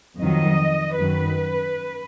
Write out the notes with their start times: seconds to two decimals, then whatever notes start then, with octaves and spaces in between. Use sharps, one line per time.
0.19 F2 D#3 F#3 D#5
0.98 F#2 D#3 F#3 B4